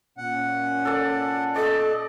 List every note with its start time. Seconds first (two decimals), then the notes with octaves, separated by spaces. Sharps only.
0.18 A#2 C#4 F#5
0.85 A4 D5
1.56 A4 D5 D#5